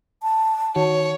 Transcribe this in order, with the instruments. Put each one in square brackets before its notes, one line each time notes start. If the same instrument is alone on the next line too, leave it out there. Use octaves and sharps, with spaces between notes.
[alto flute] A5
[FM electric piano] D#3 F#4 [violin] C#5